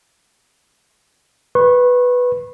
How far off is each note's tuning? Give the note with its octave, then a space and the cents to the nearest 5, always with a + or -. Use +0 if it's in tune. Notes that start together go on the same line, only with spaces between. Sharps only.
B4 +0 C#6 -35